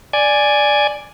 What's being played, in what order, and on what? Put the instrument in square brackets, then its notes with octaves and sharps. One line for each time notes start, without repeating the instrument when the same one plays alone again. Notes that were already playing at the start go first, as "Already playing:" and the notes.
[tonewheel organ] D5 G#5